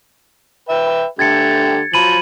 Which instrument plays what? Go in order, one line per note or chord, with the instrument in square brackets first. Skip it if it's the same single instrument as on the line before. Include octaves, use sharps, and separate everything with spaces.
[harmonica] B4 E5 G5
[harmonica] D3 A3 G4 [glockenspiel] G#6 A6 C#7
[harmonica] F3 F#3 [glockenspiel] B5 D#7 F#7